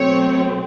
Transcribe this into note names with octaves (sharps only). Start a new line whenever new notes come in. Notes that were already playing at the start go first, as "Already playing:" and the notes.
Already playing: B2 F#3 A3 C4 C#5